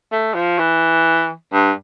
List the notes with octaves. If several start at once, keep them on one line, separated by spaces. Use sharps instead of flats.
A3
F3
E3
G2